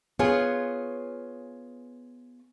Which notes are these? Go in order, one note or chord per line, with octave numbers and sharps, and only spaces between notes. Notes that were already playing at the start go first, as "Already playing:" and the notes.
B3 F4 G#4 C#5